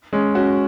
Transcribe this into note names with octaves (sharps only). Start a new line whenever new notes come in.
G#3 C#4
C#4 F#4